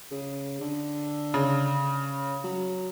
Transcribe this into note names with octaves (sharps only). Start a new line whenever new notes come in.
C#3
D3
C#3
F#3